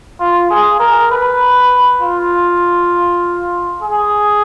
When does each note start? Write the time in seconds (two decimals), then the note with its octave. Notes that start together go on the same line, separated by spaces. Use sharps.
0.20 F4
0.50 G#4
0.80 A#4
1.11 B4
2.02 F4
3.82 G#4